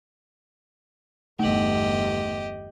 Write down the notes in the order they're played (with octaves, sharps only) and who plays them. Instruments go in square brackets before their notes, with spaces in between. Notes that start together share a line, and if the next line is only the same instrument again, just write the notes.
[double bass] G1 E2 [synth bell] A3 F#7 [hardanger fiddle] G4 D#5